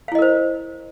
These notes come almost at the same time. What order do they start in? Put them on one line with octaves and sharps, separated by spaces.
F5 E4 D#5 A#4 C5